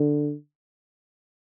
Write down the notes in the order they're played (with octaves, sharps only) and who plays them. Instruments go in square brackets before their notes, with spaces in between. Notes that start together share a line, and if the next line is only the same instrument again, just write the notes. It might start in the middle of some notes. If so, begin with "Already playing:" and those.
Already playing: [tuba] D3